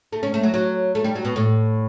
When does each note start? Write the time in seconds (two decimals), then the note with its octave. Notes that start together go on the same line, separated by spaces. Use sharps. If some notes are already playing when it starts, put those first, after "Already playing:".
0.12 A3
0.23 C#4
0.34 A3
0.43 F#3
0.54 F#3
0.95 A3
1.04 G3
1.15 F#3
1.25 B2
1.36 A2